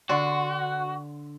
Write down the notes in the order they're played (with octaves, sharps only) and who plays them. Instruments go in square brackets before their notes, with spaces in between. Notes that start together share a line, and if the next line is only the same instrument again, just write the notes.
[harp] D3 D4 C6 [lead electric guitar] F#4